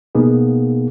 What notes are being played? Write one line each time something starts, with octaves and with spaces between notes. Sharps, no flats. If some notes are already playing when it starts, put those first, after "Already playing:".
B2 A#3 B3 D#4 G#4